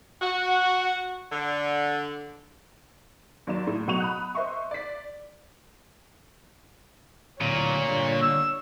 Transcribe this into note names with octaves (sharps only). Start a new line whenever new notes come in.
F#4
D3
D#2 F#3 D5 E7
A2
B2 F#3 F#5 C#6 D#7 F7
B5 D#6 F#6
C5 D#5 E5 C6 C#6
D5 B6
D2 A#2 F#3 C#5
D3 G3
E6